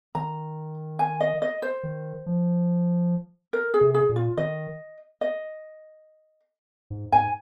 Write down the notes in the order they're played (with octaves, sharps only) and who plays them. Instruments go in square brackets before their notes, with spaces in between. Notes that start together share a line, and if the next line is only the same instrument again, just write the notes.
[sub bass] D#3 [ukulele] A#5
[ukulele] G#5
D#5
D#5
C5
[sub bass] D#3
F3
[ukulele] A#4
G#4
[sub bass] C3
[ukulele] G#4
[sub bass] A#2
[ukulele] F4
[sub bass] D#3 [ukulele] D#5
[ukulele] D#5
[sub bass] G#2
[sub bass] G#2 [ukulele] G#5